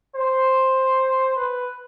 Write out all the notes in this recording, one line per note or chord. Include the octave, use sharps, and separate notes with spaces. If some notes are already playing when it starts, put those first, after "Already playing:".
C5
B4